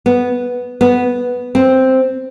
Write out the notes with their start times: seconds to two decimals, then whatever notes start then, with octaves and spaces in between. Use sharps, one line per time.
0.06 B3
0.81 B3
1.55 C4